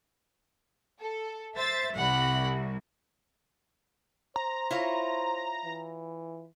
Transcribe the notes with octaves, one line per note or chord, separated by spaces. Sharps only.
A4
C5 E5 A6
C2 F#5 B5
C5 A#5
E4 F4 C#5
E3